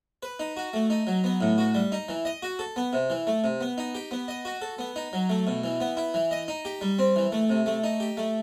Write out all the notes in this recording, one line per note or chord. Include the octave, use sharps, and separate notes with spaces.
B4
D#4
F#4
A3
D#4
F#3
B3
A2
F#4
G3
D#4
E3
D#5
F#4
A4
B3
C3
E3
A3
C3
B3
D#4
G4
B3
D#5
F#4
A4
B3
D#4
F#3
A3
B2
E3
B3
E4
E3
D#5
D#4
G4
G3
C4
E3
A3
C3
A3
D#4
G4
A3